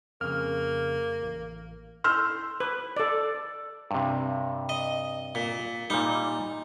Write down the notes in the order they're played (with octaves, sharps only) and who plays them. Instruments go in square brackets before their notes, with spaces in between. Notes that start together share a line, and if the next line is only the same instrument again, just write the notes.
[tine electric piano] F2 C#3 [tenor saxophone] A#3 [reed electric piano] F6
[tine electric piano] A1
[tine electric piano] A4 [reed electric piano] C6 G6 [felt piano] E6 F6
[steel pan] B4
A4 D5
[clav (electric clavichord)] G2 C3
[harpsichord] D#5
A#2
[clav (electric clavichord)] A#2 G3 [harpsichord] D#4